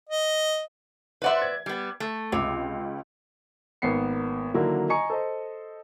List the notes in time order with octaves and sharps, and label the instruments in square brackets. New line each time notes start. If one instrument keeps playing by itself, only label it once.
[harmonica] D#5
[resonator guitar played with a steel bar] B4 D5 E5 [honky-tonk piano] C5 F#5 C6
[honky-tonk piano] G#6
[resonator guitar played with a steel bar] G3 B3
A3
[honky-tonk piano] C#2 [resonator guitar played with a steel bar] C3
[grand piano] G#1 A#3 B3 C7 C#7
D3 D#3 F#3 A#3 E4
D#5 G#5 A#5 C#6 C#7
A4 C5 D#5